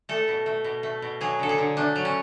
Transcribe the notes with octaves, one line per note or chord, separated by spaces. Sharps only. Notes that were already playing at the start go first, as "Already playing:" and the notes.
A3 A4
B2
A3
B2
A3
B2
F#3 G#4
D3 A4
G#4
D3
A3 D4
F#3
C#4